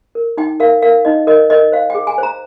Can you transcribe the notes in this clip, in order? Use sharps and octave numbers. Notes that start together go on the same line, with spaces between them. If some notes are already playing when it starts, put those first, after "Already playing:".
A#4
D#4 G5
A#4 F5
A#4 F5
D#4 D#5
A#4 D#5
A#4 D#5
C5 F5
G5
G#4
G#5
C5 A#5